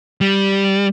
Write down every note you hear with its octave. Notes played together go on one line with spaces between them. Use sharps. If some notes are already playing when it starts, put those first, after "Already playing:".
G3